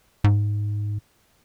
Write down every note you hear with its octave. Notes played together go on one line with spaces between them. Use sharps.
G#2